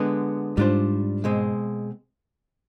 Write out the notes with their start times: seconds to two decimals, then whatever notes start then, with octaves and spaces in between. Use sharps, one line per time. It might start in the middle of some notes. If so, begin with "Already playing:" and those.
Already playing: D3 G#3 B3
0.57 G#2 G3 D4 F4 C5
1.24 B2 G#3 C4